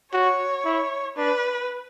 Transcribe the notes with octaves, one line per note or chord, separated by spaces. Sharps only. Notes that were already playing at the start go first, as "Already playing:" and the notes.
F#4 C#5
E4
D4 B4